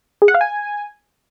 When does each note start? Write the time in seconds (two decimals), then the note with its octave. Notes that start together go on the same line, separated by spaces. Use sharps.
0.22 G#4
0.28 F#5
0.34 F5
0.41 G#5